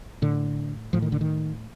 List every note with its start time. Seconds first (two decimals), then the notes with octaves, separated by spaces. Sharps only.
0.22 A2 D3
0.93 A2 F3
1.02 D#3
1.12 D3
1.21 D#3